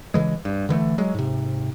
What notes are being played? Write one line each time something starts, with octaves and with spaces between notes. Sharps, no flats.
C#3 E3 G#3
G2
D3 E3 G#3 A3
F#3 G#3
G#2 C3